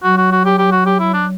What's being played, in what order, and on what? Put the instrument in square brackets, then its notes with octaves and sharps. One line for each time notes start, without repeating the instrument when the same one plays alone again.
[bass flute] F#3 [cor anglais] F#4
[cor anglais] F#4
F#4
G4
G4
F#4
G4
E4
D4